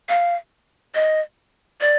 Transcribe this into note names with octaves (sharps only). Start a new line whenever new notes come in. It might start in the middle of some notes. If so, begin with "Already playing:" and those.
F5
D#5
D5